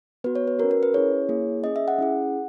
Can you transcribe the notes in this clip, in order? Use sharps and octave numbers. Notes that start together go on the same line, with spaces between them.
B3 F#4 B4
C#5
B4
C#4 F#4 A#4
A#4
B4
C#4 E4 G#4 C#5
A#3 E4 G#4
C#4 G#4 D#5
E5
F#5
C#4 E4 G#4